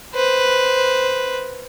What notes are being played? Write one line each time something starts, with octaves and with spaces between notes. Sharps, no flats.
B4 C5